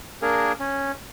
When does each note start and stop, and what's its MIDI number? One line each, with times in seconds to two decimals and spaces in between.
0.22 0.52 58
0.22 0.52 62
0.22 0.52 68
0.22 0.52 70
0.60 0.92 61